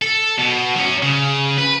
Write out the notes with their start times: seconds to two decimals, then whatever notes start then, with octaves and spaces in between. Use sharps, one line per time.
0.02 A4
0.39 B2
0.76 F#3 C#4
1.03 C#3
1.58 B4